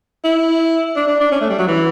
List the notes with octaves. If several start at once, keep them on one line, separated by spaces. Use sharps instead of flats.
E4
D4
D4
D4
C#4
A3
G3
F#3
E3